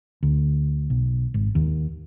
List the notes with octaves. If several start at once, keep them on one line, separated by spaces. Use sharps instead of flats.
D2
B1
G#1
D#2